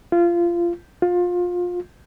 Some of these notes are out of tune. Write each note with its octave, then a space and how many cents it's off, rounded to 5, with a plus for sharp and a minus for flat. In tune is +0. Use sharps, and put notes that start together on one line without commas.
F4 -20
F4 +25